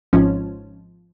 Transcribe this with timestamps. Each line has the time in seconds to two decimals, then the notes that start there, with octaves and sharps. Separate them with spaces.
0.13 G#1 G#2 F3 C#4